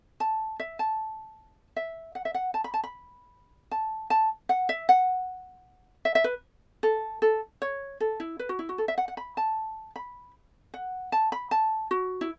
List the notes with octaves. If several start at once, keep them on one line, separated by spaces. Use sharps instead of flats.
A5
E5
A5
E5
F#5
E5
F#5
A5
B5
A5
B5
A5
A5
F#5
E5
F#5
E5
E5
B4
A4
A4
C#5
A4
E4
B4
F#4
E4
F#4
A4
E5
F#5
F#5
B5
A5
B5
F#5
A5
B5
A5
F#4
E4